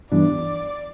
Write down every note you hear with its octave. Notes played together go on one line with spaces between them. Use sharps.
G2 E3 B3 D4 D5